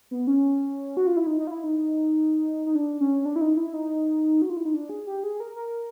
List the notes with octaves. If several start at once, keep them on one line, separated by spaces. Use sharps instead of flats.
B3
C#4
F#4
F4
E4
D#4
D#4
F4
E4
D#4
D#4
D4
C#4
D4
E4
D#4
E4
D#4
F#4
F4
E4
D#4
D4
G#4
G4
G#4
A#4
A#4